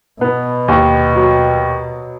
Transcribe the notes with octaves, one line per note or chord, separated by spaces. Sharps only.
B2 B3
D#2
F#3